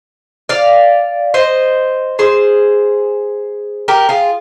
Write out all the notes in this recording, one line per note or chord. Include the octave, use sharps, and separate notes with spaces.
D5 F5
C5 D#5
G#4 C5
G4 A#4
F4 G#4